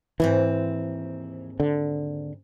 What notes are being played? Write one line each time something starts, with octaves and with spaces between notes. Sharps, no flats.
D#2 G#2 E3 C4
D3